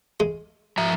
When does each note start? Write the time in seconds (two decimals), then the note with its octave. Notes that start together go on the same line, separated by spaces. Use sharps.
0.20 G#3
0.78 F3 E5 A#5